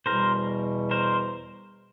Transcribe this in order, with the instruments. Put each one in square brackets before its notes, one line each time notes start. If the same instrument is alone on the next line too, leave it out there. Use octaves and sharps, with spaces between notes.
[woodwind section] E2 B2 G3 [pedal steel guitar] A#4 C5
[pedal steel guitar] A#4 C5